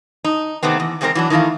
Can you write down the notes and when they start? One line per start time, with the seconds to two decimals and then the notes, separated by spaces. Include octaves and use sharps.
0.24 D#4
0.63 C3 D#3 A3 B3 C4
0.80 E2
1.01 E2 C3 G#3 C4 F4 A#4
1.15 E3 F#3 D4
1.30 D#3 E3 A3 E4 F5